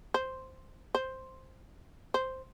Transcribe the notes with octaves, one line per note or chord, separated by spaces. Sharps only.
C5
C5
C5